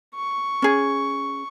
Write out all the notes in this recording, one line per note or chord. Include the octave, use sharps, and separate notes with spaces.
C#6
C#4 G#4